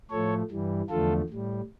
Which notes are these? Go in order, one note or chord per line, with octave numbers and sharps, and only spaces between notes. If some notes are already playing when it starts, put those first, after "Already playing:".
A2 F3 A3 A4 C#5
G2 E3 G3
E2 D3 F3 A3 F4 A4
A2 G3